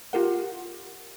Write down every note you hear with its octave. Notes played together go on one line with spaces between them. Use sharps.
F4 G4 A#4 F#5